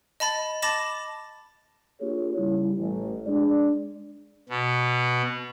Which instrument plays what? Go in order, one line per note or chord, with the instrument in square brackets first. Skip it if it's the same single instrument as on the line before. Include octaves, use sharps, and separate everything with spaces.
[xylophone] D#5 A5 B5 A6
A5 B5 D6 A6 A#6 E7
[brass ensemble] A#3 D4 F4 G4 G#4 C#5
C#3 G3 E4
A1
G#3 D4 D5
[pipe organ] B2